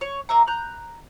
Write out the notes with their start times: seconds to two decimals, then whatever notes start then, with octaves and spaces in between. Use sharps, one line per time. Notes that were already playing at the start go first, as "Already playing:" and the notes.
0.01 C#5
0.29 A#3 E5 A#5
0.48 A#5 F#6 G6